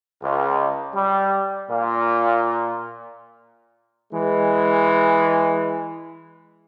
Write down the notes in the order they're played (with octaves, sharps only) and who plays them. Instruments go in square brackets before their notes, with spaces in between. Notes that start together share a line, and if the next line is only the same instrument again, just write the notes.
[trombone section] C#2
G3
A#2
E3 G#3